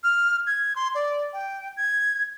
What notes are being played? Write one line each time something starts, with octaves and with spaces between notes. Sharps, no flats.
F6
G#6
C6
D5
G5
G#6